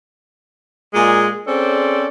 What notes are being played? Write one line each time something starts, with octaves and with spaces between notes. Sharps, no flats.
A#2 G#3 G#4
C4 C#4 G#4 A4 C5 D5